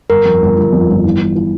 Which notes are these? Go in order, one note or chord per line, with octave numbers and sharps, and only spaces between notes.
G1 A#4
F2
G1
G1
F2
G1
E3
E3
E3